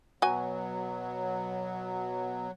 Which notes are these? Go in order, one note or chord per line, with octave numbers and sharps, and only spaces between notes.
B2 F#3 B3 F#4 G#5